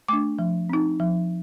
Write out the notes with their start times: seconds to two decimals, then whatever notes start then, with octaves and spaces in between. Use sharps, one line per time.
0.08 A3 D4 D6
0.39 F3
0.69 C4 D#4
1.00 F3